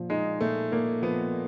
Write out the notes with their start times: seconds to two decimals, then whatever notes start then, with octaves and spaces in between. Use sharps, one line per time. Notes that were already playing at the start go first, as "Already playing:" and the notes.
Already playing: A#2 F3
0.10 G#3 D#4
0.41 A#2 A3
0.72 A#2 A#3
1.02 F3 B3